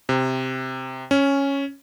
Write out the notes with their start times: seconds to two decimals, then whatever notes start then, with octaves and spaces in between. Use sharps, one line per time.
0.09 C3
1.11 C#4